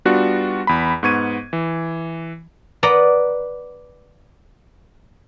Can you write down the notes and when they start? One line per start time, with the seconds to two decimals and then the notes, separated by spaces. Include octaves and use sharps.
0.05 G3 B3 D4 F4 F#4 F#6
0.67 E2 B5
1.03 G#2 B3 C#6 G#6 D#7
1.53 E3
2.83 B4 D5 D#5 F#5 A#5